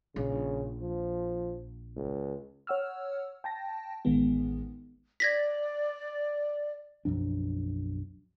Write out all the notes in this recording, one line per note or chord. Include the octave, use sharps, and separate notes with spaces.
A#1 C#3
F3
C#2
C#5 F#5 E6 F6
G5 A5 A#6
A1 D#3 G#3 B3
D5 G#6 A#6 B6
B1 F#2 F3 D4